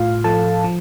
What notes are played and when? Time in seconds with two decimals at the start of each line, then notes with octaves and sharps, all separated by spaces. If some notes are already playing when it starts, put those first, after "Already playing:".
Already playing: A2 F4 F5
0.24 F3 A4 A5
0.64 F3